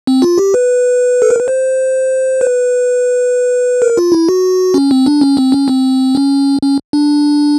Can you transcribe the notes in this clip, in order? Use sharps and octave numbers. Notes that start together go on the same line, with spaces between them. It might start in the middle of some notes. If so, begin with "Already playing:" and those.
C4
F4
G4
B4
A4
A#4
B4
C5
B4
A#4
F4
E4
F#4
C#4
C4
D4
C#4
C4
C#4
C4
C#4
C#4
D4